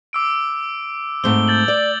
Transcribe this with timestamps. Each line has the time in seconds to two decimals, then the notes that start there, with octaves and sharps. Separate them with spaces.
0.13 D6 E6 D7
1.24 G#2 A3 C4 G7
1.48 G6 A6 F#7
1.68 D5 F#7